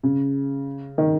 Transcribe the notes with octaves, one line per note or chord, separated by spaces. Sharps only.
C#3
D#3